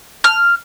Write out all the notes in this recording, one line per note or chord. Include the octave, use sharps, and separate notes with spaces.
F6